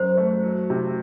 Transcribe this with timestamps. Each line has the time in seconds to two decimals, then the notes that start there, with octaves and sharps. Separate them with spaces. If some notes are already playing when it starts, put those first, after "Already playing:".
Already playing: F#2 C5
0.18 A3
0.43 F#3
0.70 C3